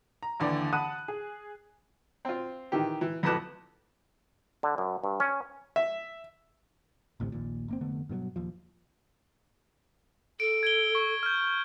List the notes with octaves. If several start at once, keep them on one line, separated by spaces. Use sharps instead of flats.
A#5
D#2 D3 E3 B4 D5 G5
F#5 A5 B5 D#6 F#6 D#7
G#4
C4 F4
D#3 E3 G4
E3
F2 A2 B4 A5 D6 F#6
D3
F#2
G2
C#4
E5
A1 D2 A2 C3
A#1 D#2 A#2
G#1 A#3 C4
F1 D3 A3 B3
G2 B2 D3 F#3
D#1 D#2 F3
A4 D7
G#6 D7 G7
C#6
F6 G6